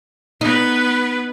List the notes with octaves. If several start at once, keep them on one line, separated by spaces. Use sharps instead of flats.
B3 D#4 B4